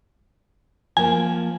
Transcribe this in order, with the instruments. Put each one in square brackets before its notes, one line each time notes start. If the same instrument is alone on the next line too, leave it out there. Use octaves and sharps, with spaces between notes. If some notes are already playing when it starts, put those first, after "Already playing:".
[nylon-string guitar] F3 A#3 [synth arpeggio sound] G#5